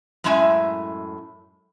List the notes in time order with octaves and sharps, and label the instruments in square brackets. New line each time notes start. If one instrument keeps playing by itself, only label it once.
[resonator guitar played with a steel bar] F#2 A2 G#3 E4 E5 G#5